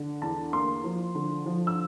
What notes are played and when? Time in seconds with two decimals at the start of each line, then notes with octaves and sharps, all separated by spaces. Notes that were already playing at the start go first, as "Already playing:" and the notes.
Already playing: D3
0.22 E2 A5
0.53 A#3 C6
0.84 F3
1.15 D3
1.46 F3
1.67 E6